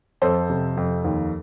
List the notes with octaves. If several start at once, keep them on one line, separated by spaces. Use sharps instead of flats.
F2 A4 C5
C3
F2
D#2